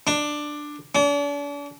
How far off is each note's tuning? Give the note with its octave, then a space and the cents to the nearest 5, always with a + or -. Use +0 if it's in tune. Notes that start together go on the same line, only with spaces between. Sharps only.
D4 +10
D4 -40